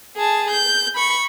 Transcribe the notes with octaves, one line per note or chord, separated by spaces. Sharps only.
G#4 A5
G6
B5 C#6